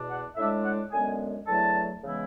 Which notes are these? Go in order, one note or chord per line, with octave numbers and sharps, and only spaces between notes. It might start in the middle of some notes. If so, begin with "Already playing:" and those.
Already playing: E2 B2 D4
F#5
A2 G#3 D4 E5
F#5
F#2 D3 G#3 B3 G#5
E2 D3 F#3 A3 E4 A5
C#3 E3 G#3 B3 E4